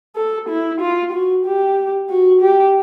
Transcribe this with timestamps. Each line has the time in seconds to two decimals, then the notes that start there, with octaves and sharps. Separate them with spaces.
0.16 A4
0.49 E4
0.80 F4
1.13 F#4
1.45 G4
2.09 F#4
2.41 G4